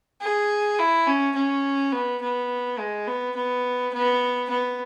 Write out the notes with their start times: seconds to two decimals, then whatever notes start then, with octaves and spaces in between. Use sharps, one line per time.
0.21 G#4
0.79 E4
1.07 C#4
1.35 C#4
1.92 B3
2.22 B3
2.79 G#3
3.07 B3
3.36 B3
3.93 B3
4.50 B3